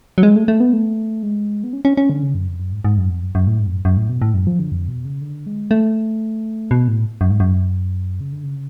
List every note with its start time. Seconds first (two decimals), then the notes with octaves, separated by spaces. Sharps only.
0.18 F#3
0.23 G#3
0.36 A3
0.48 A3
0.60 B3
0.73 A3
1.23 G#3
1.64 B3
1.73 C#4
1.85 C#4
1.97 C#4
2.10 D3
2.22 C#3
2.35 F#2
2.48 F2
2.60 F#2
2.72 G#2
2.84 G#2
2.98 F#2
3.10 F2
3.22 F#2
3.35 F#2
3.47 A2
3.59 G#2
3.67 F2
3.72 F#2
3.85 F#2
3.97 A2
4.10 B2
4.22 A2
4.34 F#2
4.47 F3
4.59 D3
4.72 F2
4.88 B2
5.05 C#3
5.21 D3
5.46 G#3
5.71 A3
6.71 B2
6.88 A2
7.21 F#2
7.30 G#2
7.40 F#2
8.20 C#3
8.32 D3
8.44 C#3